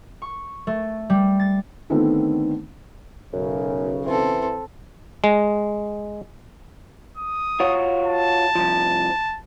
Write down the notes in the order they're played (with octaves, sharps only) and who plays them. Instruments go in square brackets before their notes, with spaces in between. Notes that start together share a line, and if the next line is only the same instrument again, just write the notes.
[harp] C#6
A3
G3
A6
[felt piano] D3 D#3 A3 B3 C4 D4
[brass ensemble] B1 C#3 [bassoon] F#2
[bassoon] E3 [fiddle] C4 A4
[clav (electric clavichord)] G#3
[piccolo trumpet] D#6
[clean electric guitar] F4 F#4 C#5
[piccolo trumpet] A5
[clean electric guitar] C2 F#2 F3